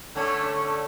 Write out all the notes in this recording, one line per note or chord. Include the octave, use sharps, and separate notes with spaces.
D3 A3 C#4